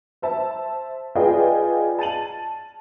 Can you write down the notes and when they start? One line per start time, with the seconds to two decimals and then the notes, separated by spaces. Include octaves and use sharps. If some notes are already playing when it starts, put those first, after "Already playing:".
0.22 C5 E5 A5
1.15 F4 G#4 B4 D5 D#5 G5
1.99 A5 A6 D#7 F#7